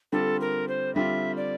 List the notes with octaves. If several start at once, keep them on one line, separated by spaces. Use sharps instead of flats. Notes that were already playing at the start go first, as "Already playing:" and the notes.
D3 G3 C4 F4 A4
A#4
C5
D3 G3 C4 F4 E5
D5